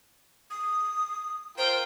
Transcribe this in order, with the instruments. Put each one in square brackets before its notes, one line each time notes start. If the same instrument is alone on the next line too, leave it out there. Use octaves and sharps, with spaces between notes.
[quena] D#6
[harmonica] F4 A#4 G5 [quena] C5